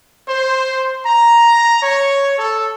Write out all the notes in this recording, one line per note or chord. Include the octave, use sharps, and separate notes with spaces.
C5
A#5
C#5
A4